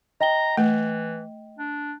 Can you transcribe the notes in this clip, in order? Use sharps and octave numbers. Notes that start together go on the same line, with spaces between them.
D#5 G5 A#5 G7
E3 A3
D4